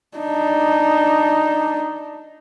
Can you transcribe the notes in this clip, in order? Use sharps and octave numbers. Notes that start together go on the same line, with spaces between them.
D4 D#4